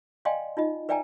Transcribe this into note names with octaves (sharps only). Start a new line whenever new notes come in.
D5 D#5 F5 G5 G#5 C6
D#4 F4 D#5
B4 D5 E5 G5 G#5 A#5